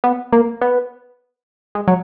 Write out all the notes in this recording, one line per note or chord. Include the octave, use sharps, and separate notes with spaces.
B3
A#3
B3
G#3
F#3